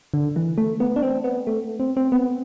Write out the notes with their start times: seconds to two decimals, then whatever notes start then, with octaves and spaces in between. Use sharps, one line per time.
0.14 D3
0.36 E3
0.58 A3
0.80 B3
0.96 D4
1.03 C4
1.24 B3
1.47 A3
1.80 C4
1.97 C4
2.12 B3